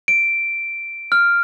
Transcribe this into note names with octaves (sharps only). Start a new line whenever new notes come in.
D7
F6